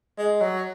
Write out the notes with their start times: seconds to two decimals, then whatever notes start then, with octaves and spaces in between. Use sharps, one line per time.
0.18 G#3
0.41 F#3